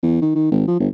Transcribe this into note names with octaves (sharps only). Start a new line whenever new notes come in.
E2
D#3
D#3
G#1
F3
G1